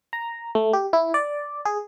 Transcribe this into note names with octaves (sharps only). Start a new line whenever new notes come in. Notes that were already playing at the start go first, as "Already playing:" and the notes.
A#5
A3
G4
E4
D5
G#4